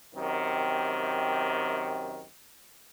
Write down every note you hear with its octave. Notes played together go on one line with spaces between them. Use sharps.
F#2 C3 D#3